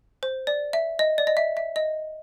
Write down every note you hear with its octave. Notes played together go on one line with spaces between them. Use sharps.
C5
D5
E5
D#5
D5
D#5
E5
E5
D#5